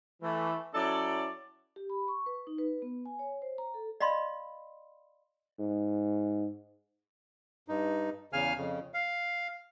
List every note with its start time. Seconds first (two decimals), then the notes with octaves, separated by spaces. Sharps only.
0.22 E3 A3
0.74 F#3 C#4 E4 A4 D5
1.76 G4
1.90 B5
2.08 C#6
2.26 B4
2.47 D#4
2.58 B4
2.82 B3
3.06 G#5
3.19 C#5
3.42 C5
3.58 A#5
3.74 A4
4.00 D5 D#5 F5 B5 C6
5.59 G#2
7.68 G2 D#4
8.33 E2 C#3 F5 G#5 F6
8.58 F2 C#3
8.94 F5